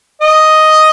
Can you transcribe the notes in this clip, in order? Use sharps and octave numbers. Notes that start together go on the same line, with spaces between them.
D#5